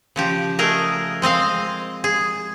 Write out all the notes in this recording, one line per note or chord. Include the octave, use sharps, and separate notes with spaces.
C#3 F3 G4
A3 G#4 A#4 D#5
G#3 C4 D#5 F5
G#4